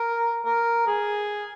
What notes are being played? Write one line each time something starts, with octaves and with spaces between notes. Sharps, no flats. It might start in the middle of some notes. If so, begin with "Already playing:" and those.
Already playing: A#4
A#4
G#4